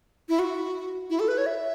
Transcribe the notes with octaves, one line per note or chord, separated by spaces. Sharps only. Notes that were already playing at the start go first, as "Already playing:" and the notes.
E4
F#4
E4
A4
B4
C#5
E5